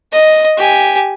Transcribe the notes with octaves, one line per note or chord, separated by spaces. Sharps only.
D#5
G4 G#5